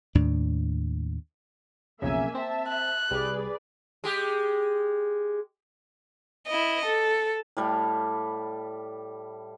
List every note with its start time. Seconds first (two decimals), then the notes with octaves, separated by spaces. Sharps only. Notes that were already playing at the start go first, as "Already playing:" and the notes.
0.15 D#2 A2 D4
2.02 B1 F2 C#3 A#3 E5 G#5
2.35 C4 E5 A5
2.68 F#6
3.11 C2 G3 G#4 B4 D5
4.04 G#3 G4
6.48 E4 D#5
6.86 A4
7.57 A2 G3 F5